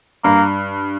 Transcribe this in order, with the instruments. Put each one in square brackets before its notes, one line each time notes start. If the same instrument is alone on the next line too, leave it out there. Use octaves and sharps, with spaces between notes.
[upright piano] G2 [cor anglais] A#3